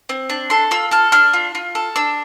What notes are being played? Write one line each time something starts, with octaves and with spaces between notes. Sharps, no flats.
C4
D4
A4 C6
F4 E6
A4 F6
D4 F6
F4
F4
A4
D4 E6